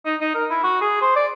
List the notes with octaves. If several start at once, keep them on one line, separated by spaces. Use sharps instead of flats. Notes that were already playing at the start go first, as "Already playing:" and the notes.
D#4
D#4
A#4
E4
F#4
G#4
C5
D5